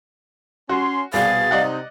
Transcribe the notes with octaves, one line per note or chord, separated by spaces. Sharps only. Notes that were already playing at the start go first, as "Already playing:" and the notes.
C#4 F#4 C6
C2 B2 G#4 D5 F5 A6
C3 D#4 D5 D#5 F#5